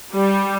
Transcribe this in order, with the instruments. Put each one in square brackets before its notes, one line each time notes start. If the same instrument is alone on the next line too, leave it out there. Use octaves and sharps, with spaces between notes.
[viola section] G3